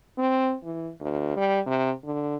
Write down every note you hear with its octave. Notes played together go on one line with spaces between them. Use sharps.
C4
E3
D2
G3
C3
D3